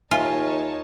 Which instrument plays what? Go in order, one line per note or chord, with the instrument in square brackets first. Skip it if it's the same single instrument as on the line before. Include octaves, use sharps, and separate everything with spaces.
[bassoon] D#2 [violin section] D#4 C#5 A5 [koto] F4 [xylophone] E5 G#5